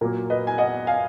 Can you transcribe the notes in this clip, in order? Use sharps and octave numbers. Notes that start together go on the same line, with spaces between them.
A#2 F#3 A#3 A#4
B4 D#5
G#5
D#5 F#5
F5 G#5